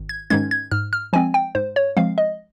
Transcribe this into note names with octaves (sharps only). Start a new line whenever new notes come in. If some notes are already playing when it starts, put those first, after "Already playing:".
Already playing: G#1
G#6
G#2 D#3 G#3 C#4 G#6
G#6
G#2 F6
F6
F3 G#3 C4 G#5
G5
G#2 C5
C#5
F3 G#3 C4 F5
D#5